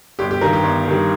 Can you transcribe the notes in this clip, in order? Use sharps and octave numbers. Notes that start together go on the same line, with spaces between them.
G1 G4
G4
G2 D#3 G3 A#4
G4
G1
G2 D#3 G3